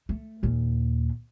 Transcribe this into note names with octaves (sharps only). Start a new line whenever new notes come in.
A3
D#2 A#2